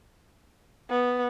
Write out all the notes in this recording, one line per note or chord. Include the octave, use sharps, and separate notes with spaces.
B3